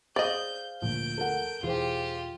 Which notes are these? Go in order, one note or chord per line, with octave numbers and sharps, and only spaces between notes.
G#4 C5 D5 D#5 F5 G6
D2 A#2 F3 G6 D7
A4 A#4 F#5
E1 E3 F4 G4 G#4 C5